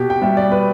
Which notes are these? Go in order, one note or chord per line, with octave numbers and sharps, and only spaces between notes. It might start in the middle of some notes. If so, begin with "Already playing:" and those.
Already playing: B2 G4
G5
G3 E5
D5
B4